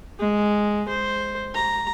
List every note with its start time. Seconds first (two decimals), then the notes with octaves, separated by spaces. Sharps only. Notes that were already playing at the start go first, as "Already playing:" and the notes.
0.19 G#3
0.88 C5
1.55 A#5